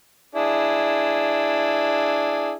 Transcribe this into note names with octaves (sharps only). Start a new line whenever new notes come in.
D4 E4 G#4